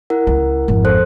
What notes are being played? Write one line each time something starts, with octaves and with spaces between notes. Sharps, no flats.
E4 A#4 F#5
C#2
G#1 F2
A4 C5 F#6